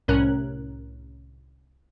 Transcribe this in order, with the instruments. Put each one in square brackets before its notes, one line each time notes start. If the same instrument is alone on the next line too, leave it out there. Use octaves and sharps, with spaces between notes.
[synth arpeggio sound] C2 A2 C#4 A#4 F#6